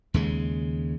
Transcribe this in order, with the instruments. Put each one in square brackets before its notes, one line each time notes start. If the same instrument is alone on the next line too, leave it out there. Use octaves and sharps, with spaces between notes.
[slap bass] D#2 C#3 G#3